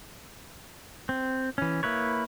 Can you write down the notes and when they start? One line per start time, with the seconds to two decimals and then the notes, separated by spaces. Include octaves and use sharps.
1.09 C4
1.58 E3 C#4
1.83 A#3 E4 B4 C#5